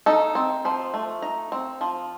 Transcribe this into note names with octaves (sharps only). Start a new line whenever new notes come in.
D#4 A4
C4
F3 C5
A3
D#4 A#5
C4
F3